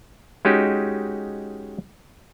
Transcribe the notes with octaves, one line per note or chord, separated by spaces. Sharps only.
G#3 C#4 D#4 F#4 G4